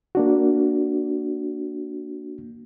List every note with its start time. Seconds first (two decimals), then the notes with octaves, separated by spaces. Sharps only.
0.15 A#3 D4 F#4